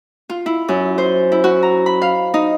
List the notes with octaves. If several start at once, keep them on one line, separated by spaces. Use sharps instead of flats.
F4
E4
F#2
C5
E4
F#4
A#5
B5
F5
D#4